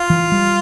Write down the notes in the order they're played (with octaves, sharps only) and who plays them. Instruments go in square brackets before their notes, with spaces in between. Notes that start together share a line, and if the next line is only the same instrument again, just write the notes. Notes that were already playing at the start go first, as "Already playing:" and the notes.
Already playing: [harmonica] F4
[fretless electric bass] E3
G3